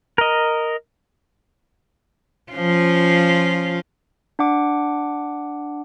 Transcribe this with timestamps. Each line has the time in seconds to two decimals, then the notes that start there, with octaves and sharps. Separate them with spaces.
0.18 A#4 D#5
2.52 F3 C#4 F4
4.39 D4 F#5 D6